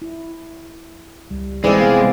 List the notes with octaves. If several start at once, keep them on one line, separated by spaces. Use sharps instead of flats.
E4
C#2 G3
F1 E3 G#3 C4 E4 D5
C3 B3 F5